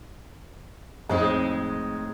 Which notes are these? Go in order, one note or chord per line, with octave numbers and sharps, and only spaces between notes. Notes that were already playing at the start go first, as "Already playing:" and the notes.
F2 A2 G#3 C4 D#4 G#4